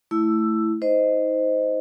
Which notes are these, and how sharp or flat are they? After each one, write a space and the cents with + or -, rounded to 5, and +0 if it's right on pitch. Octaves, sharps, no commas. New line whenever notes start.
A3 +0 E4 +0 E6 +10
D#4 +35 C5 -10 D#5 +5